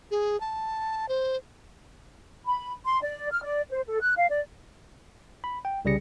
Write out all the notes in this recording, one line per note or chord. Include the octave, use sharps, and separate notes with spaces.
G#4
A5
C5
B5
C6
D5
F6
D5
C5
A4
F#6
F5
D5
B5
G5
C2 C#3 G3 G#4 A#6 C#7